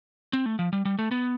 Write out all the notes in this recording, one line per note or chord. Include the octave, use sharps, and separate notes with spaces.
C4
A3
F3
G3
G3
A3
B3